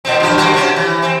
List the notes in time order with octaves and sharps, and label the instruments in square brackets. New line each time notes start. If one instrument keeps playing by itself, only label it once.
[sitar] A#2 C4
G2 F3
G2 A#3 F#4
C3 C#4
E3
C4